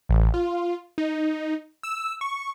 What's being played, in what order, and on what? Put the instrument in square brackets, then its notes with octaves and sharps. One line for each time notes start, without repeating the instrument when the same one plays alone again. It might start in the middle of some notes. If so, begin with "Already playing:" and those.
[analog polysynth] A1
F4
D#4
E6
C#6